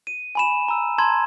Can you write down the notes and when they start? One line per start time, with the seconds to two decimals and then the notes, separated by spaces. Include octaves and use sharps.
0.07 D#7
0.35 G#5 B5 E7
0.68 A#5 E6
0.98 A5 A#5 C6 G#6